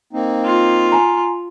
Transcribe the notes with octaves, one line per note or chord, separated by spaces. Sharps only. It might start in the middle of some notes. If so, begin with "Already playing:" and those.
A#3 C4 D#4
F4
G#5 A#5